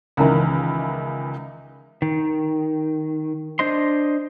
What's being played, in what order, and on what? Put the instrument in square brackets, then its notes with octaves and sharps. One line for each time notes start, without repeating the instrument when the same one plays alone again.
[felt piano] C#2 D#3 E3
[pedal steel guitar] D#3
D4 C5 D#5 C6